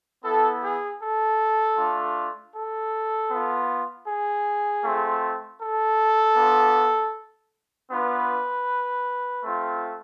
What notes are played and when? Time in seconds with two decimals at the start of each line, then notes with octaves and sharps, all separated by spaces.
0.24 B3 E4 A4
0.62 G#4
1.01 A4
1.78 A3 D4 F4
2.55 A4
3.30 B3 F4
4.08 G#4
4.84 A3 C4 F4
5.61 A4
6.36 B3 D4 F4
7.89 B3 D4 F4 B4
9.44 A3 C4 F4